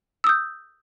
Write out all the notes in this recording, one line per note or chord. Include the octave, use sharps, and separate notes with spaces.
D#6 E6 G6